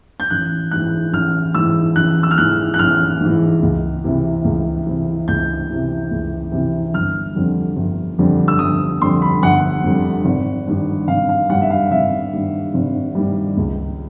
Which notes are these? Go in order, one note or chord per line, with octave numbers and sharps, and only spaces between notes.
G6
A1 F#6
G#2 E3 F#6
A1 F6
G#2 E3 E6
A1 F#6
E6
F6
G#2 E3 F#6
F#6
A1 F6
G#2
E3
C#2
C3 E3
C#2
C3 E3
C#2 G6
C3 E3
C#2
C3 E3
G1 F6
F2 D3 G3
G1
F2 D3 G3
E6
G1 D#6
F2 D3 G3 C6
B5
G1 F#5
F2 D3 G3
G#1
G2 D#3 G3
G#1 F5
F5
G2 D#3 G3 F#5
E5
F5
G#1 E5
G2 D#3 G3
G#1
G2 D#3 G3
C#2